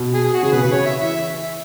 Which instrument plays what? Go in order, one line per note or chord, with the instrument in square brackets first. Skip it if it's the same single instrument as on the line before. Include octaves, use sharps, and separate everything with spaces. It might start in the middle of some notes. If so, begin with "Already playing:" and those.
Already playing: [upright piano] B2
[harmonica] G#4
G#4
F#4
[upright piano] C#3 [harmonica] G#4
[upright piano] B2 [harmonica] B4
[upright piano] C#3 [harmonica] B4
[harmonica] C#5
E5
[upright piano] E3 [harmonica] E5